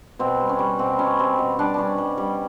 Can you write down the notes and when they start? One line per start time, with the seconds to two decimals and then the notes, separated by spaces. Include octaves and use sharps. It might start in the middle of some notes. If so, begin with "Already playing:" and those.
0.19 B2 C4
0.40 G3
0.49 C#4
0.59 G3
0.79 B2 C4
0.99 B2 C#4
1.19 G3 C4
1.39 B2
1.58 G3 D4
1.74 G3 C#4 D4
1.98 G3
2.18 G3